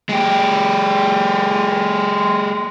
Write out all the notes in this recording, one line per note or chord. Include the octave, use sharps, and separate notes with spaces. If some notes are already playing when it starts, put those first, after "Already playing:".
G#3 G4